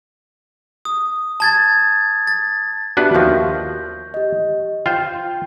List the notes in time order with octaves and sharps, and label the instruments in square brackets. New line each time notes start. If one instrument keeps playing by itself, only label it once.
[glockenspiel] D#6
A5 G#6 A6
A6
[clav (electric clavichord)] B3 D4 B4 [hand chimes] F#4 G4 E5
[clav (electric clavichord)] D#2 F3 [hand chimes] C#6 G6 A#6
[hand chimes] G4 D#5
[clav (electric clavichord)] F4 C5 [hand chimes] G5